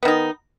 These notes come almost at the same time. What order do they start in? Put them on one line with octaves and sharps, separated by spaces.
B3 D#3 D#4